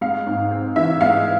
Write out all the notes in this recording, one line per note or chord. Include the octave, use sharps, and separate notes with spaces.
G#3 F5
G#2
C4
E3 E5
G#3 F5